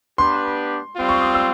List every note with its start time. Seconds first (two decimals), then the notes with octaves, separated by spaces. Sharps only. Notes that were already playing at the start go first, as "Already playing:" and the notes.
0.18 B3 D4 G4 B4 C6
0.96 G3 C4 F4
1.09 C#6
1.22 D#6
1.34 E6